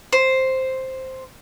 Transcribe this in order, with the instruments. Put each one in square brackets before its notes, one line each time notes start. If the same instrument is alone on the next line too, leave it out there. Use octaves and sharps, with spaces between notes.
[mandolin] C5